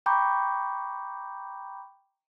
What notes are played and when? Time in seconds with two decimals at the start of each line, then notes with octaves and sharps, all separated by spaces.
0.06 G5 A#5 B5 C#6 D6 G6